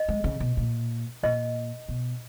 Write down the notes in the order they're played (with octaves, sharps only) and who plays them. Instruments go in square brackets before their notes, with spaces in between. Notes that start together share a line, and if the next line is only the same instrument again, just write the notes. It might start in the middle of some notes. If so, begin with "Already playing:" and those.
Already playing: [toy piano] D#5
[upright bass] G#3
C#3
B2
A#2
[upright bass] A#2 [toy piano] D#5
[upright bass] B2